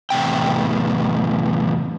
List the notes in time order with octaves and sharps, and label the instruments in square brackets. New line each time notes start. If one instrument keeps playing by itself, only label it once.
[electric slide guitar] E2 A2 C3 G5